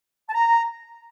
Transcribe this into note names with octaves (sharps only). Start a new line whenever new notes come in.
A5
A#5